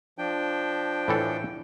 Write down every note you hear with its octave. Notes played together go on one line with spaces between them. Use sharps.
F3 D4 G5
A2 E3 A4